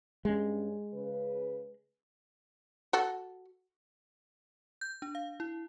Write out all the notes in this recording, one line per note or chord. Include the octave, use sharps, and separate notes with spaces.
G2 G#3 C#4
C#3 B4
F#4 A4
G6
D4
F5
E4